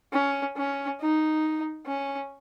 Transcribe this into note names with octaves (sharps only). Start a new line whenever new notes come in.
C#4
C#4
D#4
C#4